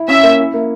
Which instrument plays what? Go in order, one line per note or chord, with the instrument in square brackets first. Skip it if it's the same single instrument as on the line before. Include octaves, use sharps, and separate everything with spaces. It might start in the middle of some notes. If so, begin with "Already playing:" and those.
Already playing: [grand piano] E4
[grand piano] C#4 [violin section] E5
[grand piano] A#3
E4
A#3